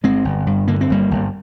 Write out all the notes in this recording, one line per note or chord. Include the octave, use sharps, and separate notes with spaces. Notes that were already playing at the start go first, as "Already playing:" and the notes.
G1 G#3 C4
G1
G2
D3 A#3
C4
G1 G3 A#3
G1